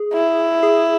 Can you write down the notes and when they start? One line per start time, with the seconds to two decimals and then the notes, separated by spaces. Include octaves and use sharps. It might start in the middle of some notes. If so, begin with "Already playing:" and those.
Already playing: G#4
0.13 E4
0.63 G#4